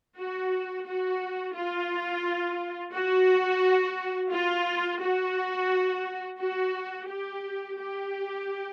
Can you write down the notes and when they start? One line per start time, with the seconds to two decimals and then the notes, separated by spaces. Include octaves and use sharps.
0.18 F#4
0.87 F#4
1.56 F4
2.94 F#4
4.32 F4
5.01 F#4
6.40 F#4
7.09 G4
7.78 G4